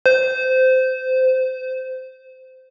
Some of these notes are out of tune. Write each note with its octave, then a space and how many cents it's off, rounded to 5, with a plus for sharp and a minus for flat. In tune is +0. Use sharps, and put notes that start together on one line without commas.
C5 -20